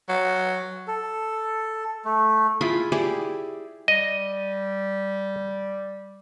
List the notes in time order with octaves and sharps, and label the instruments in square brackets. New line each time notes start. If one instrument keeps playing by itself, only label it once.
[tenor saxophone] F#3
[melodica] A4
A3
[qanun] E4 F4 G#4 B5
E4 G4 G#4 D5
[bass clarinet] G3 [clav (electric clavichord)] D#5